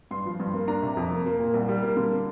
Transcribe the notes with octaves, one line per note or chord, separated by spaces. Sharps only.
G2 C6
F3
G2
A#3
D4 A#5
C3
F2
A#3
A#3
A#2
C2
G3
A#3
D3